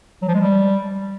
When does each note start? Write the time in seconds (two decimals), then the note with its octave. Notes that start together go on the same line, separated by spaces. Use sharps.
0.22 F#3
0.28 F3
0.35 G#3
0.41 G3